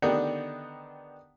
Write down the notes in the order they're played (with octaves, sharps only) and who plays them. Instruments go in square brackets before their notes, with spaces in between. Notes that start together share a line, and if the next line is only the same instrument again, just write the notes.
[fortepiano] D3 D#3 B3 D4 D#4 G4